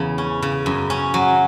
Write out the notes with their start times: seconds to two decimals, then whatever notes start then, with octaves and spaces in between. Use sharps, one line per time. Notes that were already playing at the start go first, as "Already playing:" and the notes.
Already playing: E2 C#3
0.18 C#4
0.42 C#3
0.66 F#2
0.90 C#4
1.14 F#3